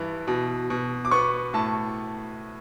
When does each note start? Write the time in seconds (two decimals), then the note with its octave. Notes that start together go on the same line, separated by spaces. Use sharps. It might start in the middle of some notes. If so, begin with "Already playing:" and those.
Already playing: G2 E3
0.27 B2
0.70 B2
1.05 D6
1.11 B3 C#6
1.54 A2 A5